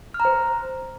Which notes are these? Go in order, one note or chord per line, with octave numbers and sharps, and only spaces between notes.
F6
A#5
C5